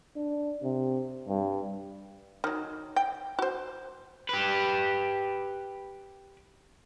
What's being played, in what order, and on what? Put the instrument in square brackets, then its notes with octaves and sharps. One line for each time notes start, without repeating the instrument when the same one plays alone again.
[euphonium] D4
C3
G2
[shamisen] D#3 F#3
G5
F#4 C5
[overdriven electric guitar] G4 B4